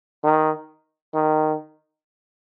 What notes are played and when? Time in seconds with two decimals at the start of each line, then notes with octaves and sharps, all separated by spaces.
0.24 D#3
1.14 D#3